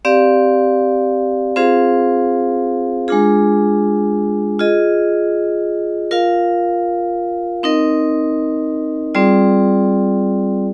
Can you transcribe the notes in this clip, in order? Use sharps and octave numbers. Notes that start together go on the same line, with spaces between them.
C4 G4 D5 F5
C4 F4 G#4 C5 F5
G#3 D4 F4 G#4
F4 G#4 D#5
F4 A#4 F5
C4 D#4 A#4 D#5
G3 C4 F4 G#4 D5